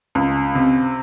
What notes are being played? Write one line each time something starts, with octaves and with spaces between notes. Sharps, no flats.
C#2
C3